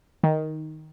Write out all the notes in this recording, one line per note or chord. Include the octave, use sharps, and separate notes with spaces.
D#3